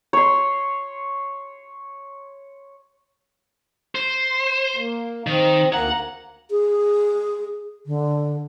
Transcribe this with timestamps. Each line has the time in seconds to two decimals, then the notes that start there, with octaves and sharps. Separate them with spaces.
0.13 C#5 C6
3.95 C5
4.76 A#3
5.27 D#3 C4
5.73 D2 A#3 F#5 A#5
6.51 G#4
7.86 D3